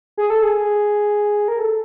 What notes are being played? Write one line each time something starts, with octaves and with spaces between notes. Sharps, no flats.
G#4
A4
G#4
A#4
A4